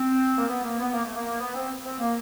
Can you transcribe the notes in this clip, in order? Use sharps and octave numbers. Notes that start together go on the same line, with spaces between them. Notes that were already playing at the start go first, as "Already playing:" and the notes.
Already playing: C4
A#3
B3
A#3
B3
A#3
A3
A#3
B3
C4
C4
A#3